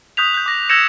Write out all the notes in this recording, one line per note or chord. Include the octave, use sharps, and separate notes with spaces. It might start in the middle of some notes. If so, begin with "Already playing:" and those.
C#6 D#6 F#6 G6 B6 F7
F#6 G6
D6 A#6
E6 G6 G#6 A#6 C#7 E7